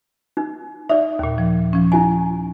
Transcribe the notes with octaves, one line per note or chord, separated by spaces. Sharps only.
D#4
D#4 D5 E5
D#2 A#2
F3
F3 C#4
D#4 E4 G#5